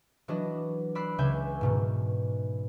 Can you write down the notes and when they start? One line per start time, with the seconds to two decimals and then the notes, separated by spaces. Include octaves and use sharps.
0.28 E3 F#3 D4 B4 D#5
0.95 D5 B5 E6 F#6 C7
1.18 C#2 C#3 C#4 E5 G#5 G6
1.61 G#2 B2 D#3